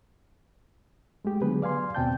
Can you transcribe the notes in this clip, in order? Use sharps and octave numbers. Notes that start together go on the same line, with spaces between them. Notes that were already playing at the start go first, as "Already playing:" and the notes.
G#3 A3 G4
D3 F#3 B3 G#4 B4
D5 F5 G#5 C6
D#2 B2 C4 G5 A5 G6